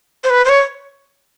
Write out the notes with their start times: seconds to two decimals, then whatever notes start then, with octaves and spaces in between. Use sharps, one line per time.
0.24 C5
0.30 B4
0.45 C5
0.49 C#5